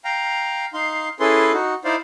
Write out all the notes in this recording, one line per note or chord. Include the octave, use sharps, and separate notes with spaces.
F5 G5 A#5
D#4 F5 C6
C#4 E4 G#4 A4 B4 C6
D#4 F#4
D#4 E4 C5 D5 F5